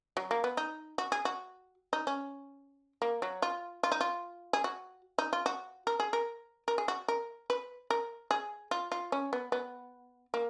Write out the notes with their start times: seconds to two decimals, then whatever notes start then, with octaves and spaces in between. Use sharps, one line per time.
0.17 F#3
0.31 A#3
0.44 B3
0.57 D#4
0.98 F#4
1.12 G#4
1.25 F#4
1.93 D#4
2.07 C#4
3.02 A#3
3.22 F#3
3.42 F4
3.83 F4
3.92 D#4
4.01 F4
4.53 G#4
4.64 F#4
5.18 D#4
5.33 F4
5.46 F#4
5.87 A#4
6.00 G#4
6.13 A#4
6.68 A#4
6.78 G#4
6.88 F#4
7.08 A#4
7.50 B4
7.90 A#4
8.31 G#4
8.71 F4
8.92 F4
9.12 C#4
9.33 B3
9.52 B3
10.34 A#3